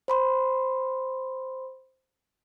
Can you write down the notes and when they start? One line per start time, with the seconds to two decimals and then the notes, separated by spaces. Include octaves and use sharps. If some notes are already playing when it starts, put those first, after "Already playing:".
0.08 C5 B5 C6